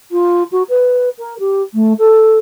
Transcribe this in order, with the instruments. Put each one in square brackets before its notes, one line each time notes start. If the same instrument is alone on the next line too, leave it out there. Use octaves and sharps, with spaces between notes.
[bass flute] F4
F#4
B4
A#4
G4
A3
A4